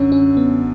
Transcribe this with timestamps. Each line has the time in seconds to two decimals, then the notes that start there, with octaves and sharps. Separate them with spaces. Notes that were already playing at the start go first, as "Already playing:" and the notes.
Already playing: F#2 D3 C#4
0.12 C#4
0.37 B3